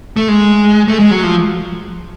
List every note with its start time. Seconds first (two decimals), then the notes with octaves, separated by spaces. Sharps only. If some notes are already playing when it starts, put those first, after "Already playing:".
0.16 A3
0.28 G#3
0.88 A3
1.00 G#3
1.11 F#3
1.23 F3